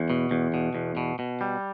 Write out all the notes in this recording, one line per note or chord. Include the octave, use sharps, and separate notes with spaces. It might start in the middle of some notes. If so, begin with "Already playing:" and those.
Already playing: E2
B2
E2
B2
E2
B2
B2
G3